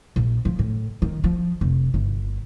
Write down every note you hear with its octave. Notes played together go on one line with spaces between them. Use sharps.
A#1
F3
A2
D#3
F3
F1
G1